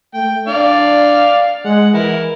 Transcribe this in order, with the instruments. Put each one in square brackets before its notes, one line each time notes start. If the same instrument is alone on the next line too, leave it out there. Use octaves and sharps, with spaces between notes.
[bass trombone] A3 [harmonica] G5
[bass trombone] D4 [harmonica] D5 F5
[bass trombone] G#3 [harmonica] F#5
[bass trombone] E3 [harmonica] E4 A#4